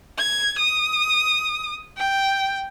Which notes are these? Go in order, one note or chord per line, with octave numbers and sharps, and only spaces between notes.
G#6
D#6
G5